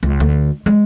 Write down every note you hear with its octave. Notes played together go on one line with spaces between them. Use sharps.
C#2
D2
G#3